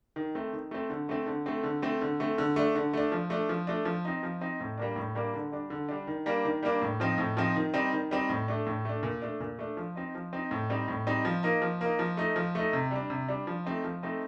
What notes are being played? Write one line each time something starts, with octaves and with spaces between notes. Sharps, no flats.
D#3
A3 C4
D#3
A3 C4
D3
A3 C4
D3
A3 C4
D3
A3 C4
D3
A3 C4
D3
A3 D4
D3
A3 D4
F3
A3 D4
F3
A3 D4
F3
C4 D#4
F3
C4 D#4
A2
G3 A#3 D4
A2
G3 A#3 D4
D3
G3 D4
D3
G3 D4
D#3
G3 A#3 D4
D#3
G3 A#3 D4
A2
F3 C4 D#4
A2
F3 C4 D#4
D#3
G3 C4 D#4
D#3
G3 C4 D#4
A2
A3 D4
A2
A3 D4
A#2
A3 D4
A#2
A3 D4
F3
C4 D#4
F3
C4 D#4
A2
G3 C4 D#4
A2
G3 C4 D#4
F3
A#3 D#4
F3
A#3 D#4
F3
A3 D#4
F3
A3 D#4
C3
G3 D4
C3
G3 D4
F3
A3 C4 D#4
F3
A3 C4 D#4